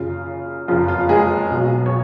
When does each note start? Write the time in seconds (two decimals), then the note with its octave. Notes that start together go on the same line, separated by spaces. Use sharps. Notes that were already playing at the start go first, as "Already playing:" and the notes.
Already playing: F#1 F#2 C#3 F4
0.68 F#1 F2 C#3 F3 F4
0.88 F4
1.09 G#3 G#4
1.51 B1 B2 F#3
1.86 C#5